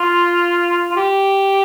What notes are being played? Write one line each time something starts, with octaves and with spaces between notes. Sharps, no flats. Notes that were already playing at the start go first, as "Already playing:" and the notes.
Already playing: F4
F4
G4